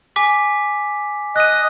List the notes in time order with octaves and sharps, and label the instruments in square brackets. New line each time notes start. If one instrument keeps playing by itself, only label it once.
[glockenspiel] G#5 D6 B6
[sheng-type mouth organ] D#5 [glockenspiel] F#6 D#7